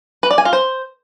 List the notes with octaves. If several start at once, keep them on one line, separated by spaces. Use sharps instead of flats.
B4
D5
G#5
F4
C5